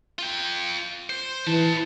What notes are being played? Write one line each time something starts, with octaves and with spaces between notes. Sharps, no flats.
F4 G5
C5
E3 B4 A5